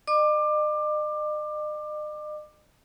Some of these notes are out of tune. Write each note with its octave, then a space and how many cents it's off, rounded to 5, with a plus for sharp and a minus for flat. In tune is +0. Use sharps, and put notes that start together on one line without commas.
D#5 -45 D6 +20